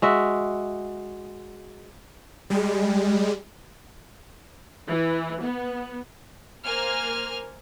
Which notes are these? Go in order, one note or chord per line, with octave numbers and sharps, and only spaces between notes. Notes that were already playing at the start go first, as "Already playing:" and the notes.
G#3 F#4 E5
G3 G#3
E3
B3
A#3 C5 G#5 F6